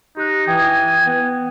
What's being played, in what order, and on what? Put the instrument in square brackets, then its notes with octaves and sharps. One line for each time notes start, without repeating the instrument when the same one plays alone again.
[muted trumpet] D#4 [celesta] G4 F#6
[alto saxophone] E3 [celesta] G5 D#6 [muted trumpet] G#5
[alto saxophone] B3